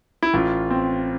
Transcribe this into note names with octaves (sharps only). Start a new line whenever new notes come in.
E4
A1 F4
C4